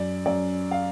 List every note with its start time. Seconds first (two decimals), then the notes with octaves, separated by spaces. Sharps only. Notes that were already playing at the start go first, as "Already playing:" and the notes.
Already playing: F#2 D5
0.26 F#2 D5
0.71 F5